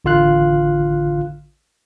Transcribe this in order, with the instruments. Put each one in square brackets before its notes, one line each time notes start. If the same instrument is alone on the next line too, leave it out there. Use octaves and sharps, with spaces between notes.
[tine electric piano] A1 D3 F4 F5 F#6